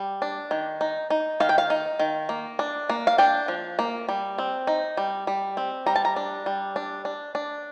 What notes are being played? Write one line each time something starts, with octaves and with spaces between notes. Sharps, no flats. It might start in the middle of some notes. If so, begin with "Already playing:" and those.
Already playing: G3
D4
D#3
D#4
D#4
D#3 F5
G5
F5
D#4
D#3
A#3
D4
A#3
F5
D4 G5
F3
A#3
G3
C4
D#4
G3
G3
C4
G3 A#5
A5
A#5
D4
G3
D4
D4
D4